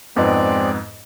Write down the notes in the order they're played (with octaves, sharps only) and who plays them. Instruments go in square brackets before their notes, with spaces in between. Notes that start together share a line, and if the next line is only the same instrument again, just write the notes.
[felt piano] F2 G#2 B3 [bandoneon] G#3 C4 D5